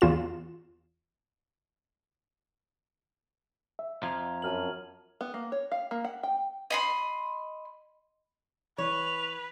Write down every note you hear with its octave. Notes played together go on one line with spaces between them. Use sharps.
E2 F4 E7
E5
F2 F3 A#5 G#6 F7
F#2 A5 F6 F#7
B3
A#3
C#5
F5
A#3
F#5
G5
D#5 B5 C6
E3 B4 C#5 F7